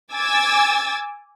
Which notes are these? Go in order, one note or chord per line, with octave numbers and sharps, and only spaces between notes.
G#5 D6 E6 G#6 A6